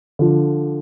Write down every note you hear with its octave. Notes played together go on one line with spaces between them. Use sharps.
D3 F3